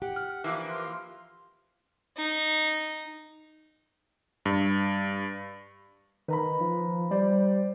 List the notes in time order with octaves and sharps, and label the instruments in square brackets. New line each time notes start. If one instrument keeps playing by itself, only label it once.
[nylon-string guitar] G4 [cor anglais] F#5
[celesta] F6
[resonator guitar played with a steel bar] E3 F3 A#3 [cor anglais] D4
[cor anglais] F4
[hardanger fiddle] D#4
[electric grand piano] G2
[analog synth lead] D#3 [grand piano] B4 A#5 B5
[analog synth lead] F3
[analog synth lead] G3 [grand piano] C5 D5